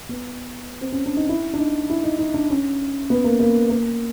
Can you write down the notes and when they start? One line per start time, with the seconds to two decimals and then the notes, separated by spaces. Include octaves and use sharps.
0.09 B3
0.81 C4
0.92 C#4
1.06 D4
1.17 D#4
1.29 E4
1.53 D4
1.59 D#4
1.90 E4
2.04 D#4
2.19 D#4
2.34 D4
2.50 C#4
3.10 B3
3.24 A#3
3.40 A#3
3.70 A#3